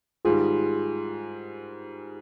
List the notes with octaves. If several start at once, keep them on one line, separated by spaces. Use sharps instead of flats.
G#2 D#3 G3 F4 G#4